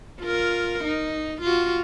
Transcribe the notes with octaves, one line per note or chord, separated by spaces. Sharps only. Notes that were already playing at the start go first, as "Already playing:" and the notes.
F4 A#4
D#4
F4 F#4